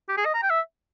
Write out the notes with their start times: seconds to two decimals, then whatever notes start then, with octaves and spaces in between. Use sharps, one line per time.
0.09 G4
0.17 G#4
0.25 D#5
0.34 A#5
0.43 G5
0.50 E5